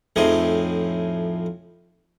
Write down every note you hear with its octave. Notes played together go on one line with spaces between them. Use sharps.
F2 A2 F3 D#4 G#4